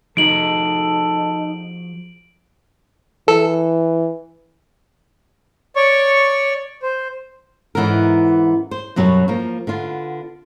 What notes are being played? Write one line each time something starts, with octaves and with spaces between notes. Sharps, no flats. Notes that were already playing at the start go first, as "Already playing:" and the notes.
F3 D#4 F#4 G#4 A4 D7 F#7
E3 A4
C#5 D5 C#6
C5
G#2 E3 B3 C#4 A4 A#4
C5
F#2 B2 F#3 G3 C#5
F3 A#3
D3 B3 F4